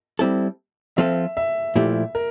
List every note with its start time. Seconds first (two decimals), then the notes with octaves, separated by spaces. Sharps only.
0.19 G3 C4 E4 A4
0.97 F3 C4 F4 A4 E5
1.37 E5
1.76 A#2 F3 A3 E4 G4
2.15 A#4